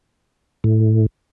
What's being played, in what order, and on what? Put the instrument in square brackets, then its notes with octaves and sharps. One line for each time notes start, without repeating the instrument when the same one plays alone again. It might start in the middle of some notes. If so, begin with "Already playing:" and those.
[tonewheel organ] A2